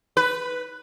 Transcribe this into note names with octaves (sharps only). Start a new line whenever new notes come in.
B4